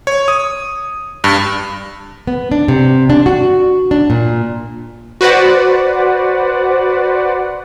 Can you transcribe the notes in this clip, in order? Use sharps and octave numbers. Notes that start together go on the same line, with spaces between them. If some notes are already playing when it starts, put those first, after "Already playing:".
C#5
D#6
G2
B3
D4
C3
D4
F#4
D4
A#2
F#4 B4 C5 D5 F#5